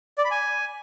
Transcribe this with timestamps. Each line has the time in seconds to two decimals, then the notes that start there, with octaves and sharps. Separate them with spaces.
0.18 D5
0.25 B5
0.31 G#5